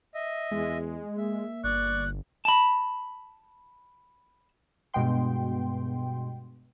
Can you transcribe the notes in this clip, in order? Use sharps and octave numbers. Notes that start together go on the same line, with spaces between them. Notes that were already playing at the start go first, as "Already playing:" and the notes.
D#5 E5
E2 G#3
A#3 E5
G1 D5 C#6 F#6
A5 B5
G2 B2 G#3 B3 G5 C6